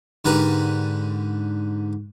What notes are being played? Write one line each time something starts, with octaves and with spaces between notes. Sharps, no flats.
G#2 D3 G4 A#4 B4